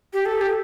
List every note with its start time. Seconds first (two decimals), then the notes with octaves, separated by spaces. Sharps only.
0.13 G4
0.26 A4
0.41 G4